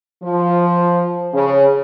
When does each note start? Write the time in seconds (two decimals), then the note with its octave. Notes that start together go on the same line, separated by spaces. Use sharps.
0.23 F3
1.34 C#3